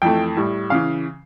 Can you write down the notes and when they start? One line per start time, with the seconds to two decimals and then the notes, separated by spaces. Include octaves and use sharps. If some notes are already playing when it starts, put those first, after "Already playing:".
0.02 F2 E3 A3 G5
0.37 A2 G3
0.70 C#3 E3 F5